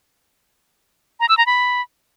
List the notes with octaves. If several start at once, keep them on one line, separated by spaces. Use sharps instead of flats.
A#5
E6
A#5
B5